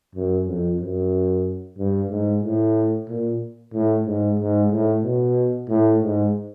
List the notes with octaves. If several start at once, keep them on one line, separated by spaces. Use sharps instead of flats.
F#2
F2
F#2
G2
G#2
A2
A#2
A2
G#2
G#2
A2
B2
A2
G#2